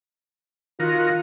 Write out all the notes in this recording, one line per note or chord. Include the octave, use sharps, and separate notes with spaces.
D#3 F4 F#4 A#4